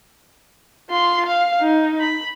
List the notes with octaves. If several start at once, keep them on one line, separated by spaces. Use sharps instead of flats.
F4 C6
F5
D#4
B5